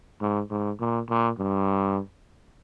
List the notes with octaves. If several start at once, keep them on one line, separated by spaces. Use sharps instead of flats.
G#2
G#2
A#2
A#2
G2